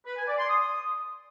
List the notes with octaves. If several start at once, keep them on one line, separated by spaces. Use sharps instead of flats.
B4
G#5
D5
C6
D#6